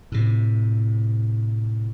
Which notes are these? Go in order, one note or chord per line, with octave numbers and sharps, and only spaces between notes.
A2 C3